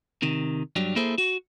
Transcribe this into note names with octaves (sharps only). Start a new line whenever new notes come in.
C3 D#3
G2 F#3 G3
A#3 E4 G#4 A4 C5
F#4